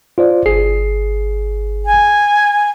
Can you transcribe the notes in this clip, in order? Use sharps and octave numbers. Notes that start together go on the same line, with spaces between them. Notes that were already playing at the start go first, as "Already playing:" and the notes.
F4 C5 D5
G1 G#4 C7
G#5